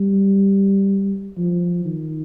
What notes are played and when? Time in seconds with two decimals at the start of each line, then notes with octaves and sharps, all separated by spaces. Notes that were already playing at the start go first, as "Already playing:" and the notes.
Already playing: G3
1.37 F3
1.85 D#3